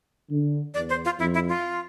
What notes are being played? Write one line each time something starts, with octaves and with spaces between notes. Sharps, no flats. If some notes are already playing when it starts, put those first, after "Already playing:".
D3
E2 D5
C5
F4
F2 E4
E4
F4